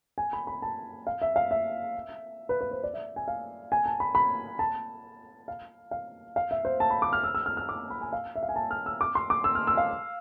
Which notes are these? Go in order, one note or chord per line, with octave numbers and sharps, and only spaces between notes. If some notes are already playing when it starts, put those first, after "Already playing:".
G#5
B5
B5
A5
F5
E5
F5
E5
B4
B4
C5
D5
E5
G#5
F5
G#5
A5
B5
B5
A5
F5
F5
F5
E5
C5
A5
B5
D6
F6
E6
E6
F6
F6
D6
B5
G#5
F5
E5
F5
G#5
A5
F6
E6
D6
C6
D6
E6
F6
E6
F5